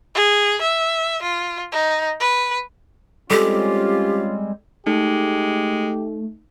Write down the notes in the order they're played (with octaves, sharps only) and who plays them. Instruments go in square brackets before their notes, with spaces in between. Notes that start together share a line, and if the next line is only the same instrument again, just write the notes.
[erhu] G#4
E5
F4
D#4
B4
[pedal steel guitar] G3 G#3 C4 [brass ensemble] C#4 F4 [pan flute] G4 [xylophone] A4
[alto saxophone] G#3 [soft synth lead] A3 [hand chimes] D#4 [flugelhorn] G4